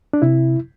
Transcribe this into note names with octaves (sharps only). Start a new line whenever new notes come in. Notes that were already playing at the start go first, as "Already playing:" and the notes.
D4
C3 E4